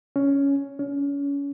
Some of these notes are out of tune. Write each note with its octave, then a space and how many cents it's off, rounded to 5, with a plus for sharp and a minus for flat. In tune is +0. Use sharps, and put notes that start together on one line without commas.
C#4 +10
C#4 +30